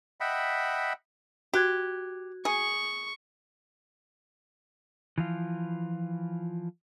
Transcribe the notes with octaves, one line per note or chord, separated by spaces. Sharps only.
D#5 E5 F#5 G5 B5
F#4 G4 F#6 G#6
G#4 C#6
E3 F3 F4